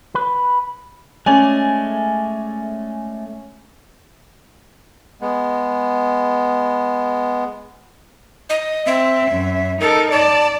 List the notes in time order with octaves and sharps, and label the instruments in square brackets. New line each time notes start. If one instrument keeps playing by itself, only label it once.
[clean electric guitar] B4
[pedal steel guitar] G#3 A3 D5 [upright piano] C#4 G#5
[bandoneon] G#3 B3
[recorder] D#5
[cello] C4 [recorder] E5
[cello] F#2
[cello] D#4 A4 [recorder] A#4
[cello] D5 [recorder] A5